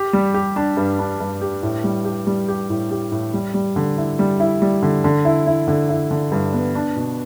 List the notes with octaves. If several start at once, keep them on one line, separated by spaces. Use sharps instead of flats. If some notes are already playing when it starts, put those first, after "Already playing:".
Already playing: G4
G3
G4
D4
G2
D4
G2
G4
A2
G3
G4
G3
G4
A2
G4
A2
G3
G3
D3
E4
G3
E4
G3
D3
D3
E4
E4
D3
E4
D3
G2
B3
D4
B2